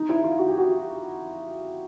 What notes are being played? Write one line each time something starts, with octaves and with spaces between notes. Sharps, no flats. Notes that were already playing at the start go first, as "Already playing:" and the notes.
Already playing: D#4
E4
F4
F#4
G4
F#4